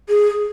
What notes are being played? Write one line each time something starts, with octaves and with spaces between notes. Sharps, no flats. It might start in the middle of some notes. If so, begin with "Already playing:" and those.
G#4